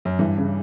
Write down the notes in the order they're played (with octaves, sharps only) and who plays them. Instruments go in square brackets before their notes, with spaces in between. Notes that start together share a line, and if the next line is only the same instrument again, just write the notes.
[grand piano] F#2
[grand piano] G2 [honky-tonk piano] E3
[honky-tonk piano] C#3